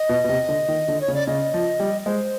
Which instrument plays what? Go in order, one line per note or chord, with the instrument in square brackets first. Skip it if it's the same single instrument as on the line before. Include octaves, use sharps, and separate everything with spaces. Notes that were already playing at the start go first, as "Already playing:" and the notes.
Already playing: [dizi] D#5
[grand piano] B2
B2
C3
D3
D#3
D3
[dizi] C#5
[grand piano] C#3
[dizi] D5
[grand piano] C#3 [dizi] D#5
[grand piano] F3
G3
[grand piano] G#3 [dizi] C5